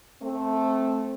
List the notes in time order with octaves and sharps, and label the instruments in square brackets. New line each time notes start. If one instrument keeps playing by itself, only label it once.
[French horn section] A3 C4